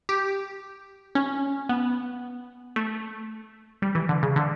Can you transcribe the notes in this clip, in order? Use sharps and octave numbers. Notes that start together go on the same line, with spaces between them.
G4
C#4
B3
A3
G3
E3
D3
C#3
D3